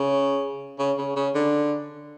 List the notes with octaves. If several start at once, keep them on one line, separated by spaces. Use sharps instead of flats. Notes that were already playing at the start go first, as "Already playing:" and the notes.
Already playing: C#3
C#3
C#3
C#3
D3